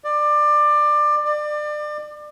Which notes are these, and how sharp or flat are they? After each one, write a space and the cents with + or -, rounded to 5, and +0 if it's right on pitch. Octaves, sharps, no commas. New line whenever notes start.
D5 +20
D5 +30